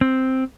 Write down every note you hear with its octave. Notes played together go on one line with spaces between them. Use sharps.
C4